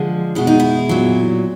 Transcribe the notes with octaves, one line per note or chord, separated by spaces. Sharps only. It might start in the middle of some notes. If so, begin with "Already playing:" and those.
Already playing: D3 F3 G#3
B2 G#3 E4
D#4
E4
A#2 F#3